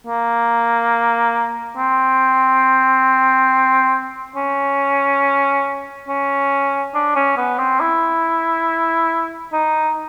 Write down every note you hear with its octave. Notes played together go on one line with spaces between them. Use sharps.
A#3
C4
C#4
C#4
D4
C#4
B3
C4
E4
D#4